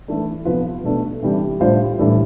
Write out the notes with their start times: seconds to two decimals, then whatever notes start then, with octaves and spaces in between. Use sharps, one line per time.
0.08 E3 A3 D4 A4
0.45 C3 F3 B3 F4 B4
0.84 B2 A3 D4
1.23 C3 E3 G3 D4 G4
1.60 A2 G3 D4 F4 C5
1.99 A2 E3 G3 D4 A4